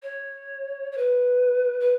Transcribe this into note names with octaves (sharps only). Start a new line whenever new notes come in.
C#5
C#5
B4
B4